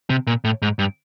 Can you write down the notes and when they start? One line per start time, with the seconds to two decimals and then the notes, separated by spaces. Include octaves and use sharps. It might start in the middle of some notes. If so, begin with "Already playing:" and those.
0.10 C3
0.27 A#2
0.44 A2
0.62 G#2
0.79 G2